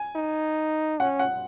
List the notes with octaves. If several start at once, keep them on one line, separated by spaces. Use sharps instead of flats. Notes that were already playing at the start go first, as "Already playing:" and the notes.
Already playing: G#5
D#4
C#4 F#5
F#5